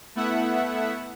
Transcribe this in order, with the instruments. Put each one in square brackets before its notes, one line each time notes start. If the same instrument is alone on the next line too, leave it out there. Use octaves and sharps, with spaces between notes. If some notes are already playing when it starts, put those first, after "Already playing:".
[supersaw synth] A3 B3 E4 E5 F#5